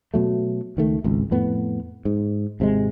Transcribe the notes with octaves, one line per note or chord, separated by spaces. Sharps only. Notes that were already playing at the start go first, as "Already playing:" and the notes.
B2 F#3 A3
C#2 D#3 A3
G#1 C#2
F2 A2 B3
G#2
G#1 C3 D#3 G#3